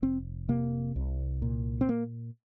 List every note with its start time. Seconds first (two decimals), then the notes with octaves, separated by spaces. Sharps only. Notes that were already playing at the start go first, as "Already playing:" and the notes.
0.02 F1 C4
0.49 C3 A#3
0.96 C2
1.42 A#2
1.81 C4
1.89 A#3